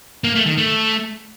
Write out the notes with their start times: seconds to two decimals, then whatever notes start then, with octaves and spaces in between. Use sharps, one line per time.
0.24 A#3
0.35 A3
0.46 D#3
0.58 A3